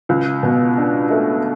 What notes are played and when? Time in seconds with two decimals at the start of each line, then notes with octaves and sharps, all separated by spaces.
0.09 C#2
0.43 B2
0.78 D4
1.11 A3